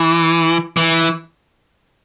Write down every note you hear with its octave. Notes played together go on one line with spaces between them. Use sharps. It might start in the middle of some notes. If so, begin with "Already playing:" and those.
Already playing: E3
E3